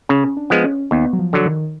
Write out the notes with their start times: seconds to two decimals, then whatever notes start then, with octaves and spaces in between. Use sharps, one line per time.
0.09 C#3 C#4
0.37 D4
0.50 F3 G#3 B3
0.64 C#4
0.91 D#2 B3
1.13 F#3
1.19 F3
1.33 D3 F#3
1.46 D#3